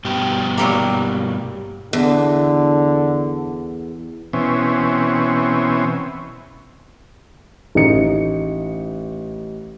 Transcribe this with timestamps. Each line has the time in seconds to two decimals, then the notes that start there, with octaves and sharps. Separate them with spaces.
0.05 G2 B2 G4
0.57 F#3 G3 A#3
1.93 E2 D3
4.33 B2 E3 C4 C#4
7.75 A1 D#4 C#7